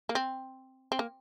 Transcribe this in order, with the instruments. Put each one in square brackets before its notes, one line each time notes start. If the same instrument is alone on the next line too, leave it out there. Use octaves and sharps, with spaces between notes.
[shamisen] A#3
C4
C4
A#3